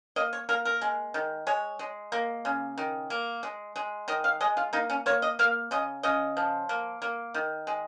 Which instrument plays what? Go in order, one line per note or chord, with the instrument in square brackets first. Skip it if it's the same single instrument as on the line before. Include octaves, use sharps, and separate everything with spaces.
[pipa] A#3 D#5
C#5
A#3 A#4
A#4
G#3
D#3
G#3 C#5
G#3
A#3
C#3
D#3
A#3
G#3
G#3
D#3 D#5
F5
G#3 D#5
F4
A#3 D#4
C#4
A#3 C#5
D#5
A#3 F5
C#3 D#5
C#3 D#5
F3
A#3
A#3
D#3
G#3